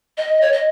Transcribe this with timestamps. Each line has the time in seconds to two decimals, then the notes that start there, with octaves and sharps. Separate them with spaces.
0.17 D#5
0.41 C#5
0.53 D#5